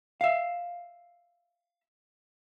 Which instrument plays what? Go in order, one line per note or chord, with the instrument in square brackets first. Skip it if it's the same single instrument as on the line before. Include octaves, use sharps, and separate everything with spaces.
[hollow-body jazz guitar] E5 F5